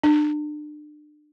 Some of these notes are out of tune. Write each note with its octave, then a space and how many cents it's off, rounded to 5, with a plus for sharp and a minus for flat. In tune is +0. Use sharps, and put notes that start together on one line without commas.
D4 +35